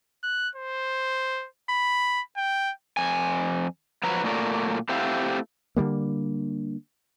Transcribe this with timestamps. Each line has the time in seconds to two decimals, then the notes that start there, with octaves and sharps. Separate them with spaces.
0.23 F#6
0.55 C5
1.70 B5
2.37 G5
2.97 F2 G#5
4.03 F3 F#3 B4 A#5
4.24 A#2 F#3 A3 A#4 D5
4.89 A3 C4 E4 G4 F5 F#5
5.77 D3 E3 G3 A#3